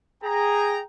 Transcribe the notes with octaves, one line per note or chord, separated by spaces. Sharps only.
G#4 G5 A#5